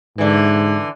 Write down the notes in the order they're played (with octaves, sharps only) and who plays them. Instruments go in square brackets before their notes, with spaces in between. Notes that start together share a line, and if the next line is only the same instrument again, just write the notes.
[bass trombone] G#2 [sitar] D3 E3